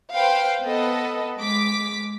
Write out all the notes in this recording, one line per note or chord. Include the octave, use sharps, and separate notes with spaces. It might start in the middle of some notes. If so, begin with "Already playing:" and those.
B4 C5 F5 G5
B3 A4 B4 D#5
G#3 D6 B6